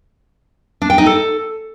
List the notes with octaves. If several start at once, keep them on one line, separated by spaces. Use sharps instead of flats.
D4
G5
D#4
A4